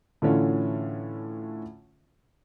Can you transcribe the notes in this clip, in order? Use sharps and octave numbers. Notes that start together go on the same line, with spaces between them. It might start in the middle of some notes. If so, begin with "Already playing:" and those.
A2 D3 E3 C#4 F4